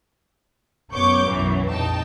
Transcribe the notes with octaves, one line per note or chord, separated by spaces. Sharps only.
F#2 B3 C#5 C#6 D6 G6
B1 F#2 E3 F#3
A#1 F2 D#4 G5 A5